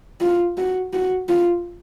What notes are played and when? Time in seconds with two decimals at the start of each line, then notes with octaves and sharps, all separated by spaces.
0.21 F4
0.58 F#4
0.93 F#4
1.29 F4